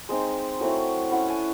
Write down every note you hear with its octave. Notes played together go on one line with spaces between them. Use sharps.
G#3 C4 D#4
F#3 A3 C4 E4
A3 C#4 E4 F#5
G#5